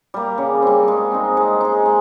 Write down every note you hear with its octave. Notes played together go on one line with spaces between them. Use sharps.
G3 A#3
C#3
G3 C4
G#3
C4 D#4
G#3
D#4 G#4
G#3